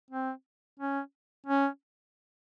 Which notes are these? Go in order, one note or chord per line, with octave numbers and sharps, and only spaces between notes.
C4
C#4
C#4